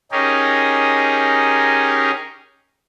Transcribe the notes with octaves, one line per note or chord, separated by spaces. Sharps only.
C#4 D#4 G4 G#4 A#4